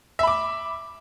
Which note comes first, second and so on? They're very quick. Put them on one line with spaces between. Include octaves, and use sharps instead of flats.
E5 B5 D6